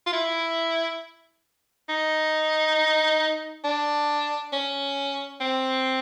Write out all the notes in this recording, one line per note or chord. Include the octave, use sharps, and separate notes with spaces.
F4
E4
D#4
D4
C#4
C4